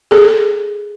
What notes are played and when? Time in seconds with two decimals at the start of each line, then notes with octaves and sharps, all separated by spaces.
0.11 G#4 A4